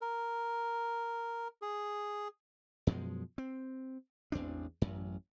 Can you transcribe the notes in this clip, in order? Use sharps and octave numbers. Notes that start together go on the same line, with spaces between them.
A#4
G#4
F#2 B2 F3 G#3
C4
A1 E2 C4 D4
A1 F#2